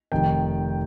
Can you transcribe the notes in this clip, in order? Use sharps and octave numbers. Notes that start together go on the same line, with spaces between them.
F1 F2 D#3 G5